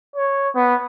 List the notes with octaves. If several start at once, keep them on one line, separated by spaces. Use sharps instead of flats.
C#5
B3